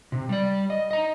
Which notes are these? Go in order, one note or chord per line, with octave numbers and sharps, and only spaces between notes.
C3
G3 D5
D#5
D#5 A#5